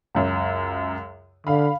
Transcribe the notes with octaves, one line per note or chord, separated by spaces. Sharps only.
C#2 F#2
D3 F5 B5